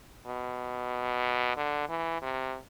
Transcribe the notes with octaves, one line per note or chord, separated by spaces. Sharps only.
B2
D3
E3
C3